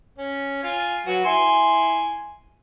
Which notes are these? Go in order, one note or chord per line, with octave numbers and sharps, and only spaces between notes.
C#4
F4 G#5
F#3 F#4 B4
E4 G#5 C6